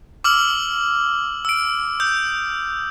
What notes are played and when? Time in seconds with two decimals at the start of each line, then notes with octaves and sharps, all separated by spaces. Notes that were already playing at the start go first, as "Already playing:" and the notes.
0.24 D6 E6 F6 F#7
1.45 E6 D7
2.00 D#6 E6 G6